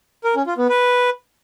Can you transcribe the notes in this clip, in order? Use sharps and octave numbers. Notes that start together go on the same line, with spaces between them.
A#4
C#4
F4
B3
B4